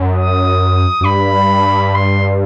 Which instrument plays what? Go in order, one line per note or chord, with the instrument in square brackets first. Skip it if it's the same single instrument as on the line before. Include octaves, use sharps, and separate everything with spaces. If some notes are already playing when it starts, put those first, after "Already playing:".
Already playing: [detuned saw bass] F#2
[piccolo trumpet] D#6
[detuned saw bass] F#2
[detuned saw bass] G2 [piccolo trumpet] B5
[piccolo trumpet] C6